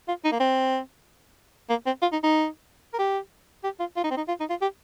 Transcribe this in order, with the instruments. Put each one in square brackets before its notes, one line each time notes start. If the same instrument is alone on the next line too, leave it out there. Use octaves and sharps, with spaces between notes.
[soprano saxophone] F4
D#4
A#3
C4
A#3
C4
F4
D#4
D#4
A#4
G4
G4
F4
F4
D#4
C4
D#4
F4
D#4
F4
G4